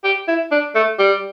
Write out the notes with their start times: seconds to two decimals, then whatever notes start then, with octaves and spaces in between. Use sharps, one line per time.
0.04 G4
0.28 E4
0.51 D4
0.75 A3
0.99 G3